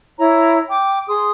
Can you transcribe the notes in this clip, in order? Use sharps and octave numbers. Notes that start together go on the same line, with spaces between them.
E4 C#5 A#5
G5 D6
G#4 C6 D#6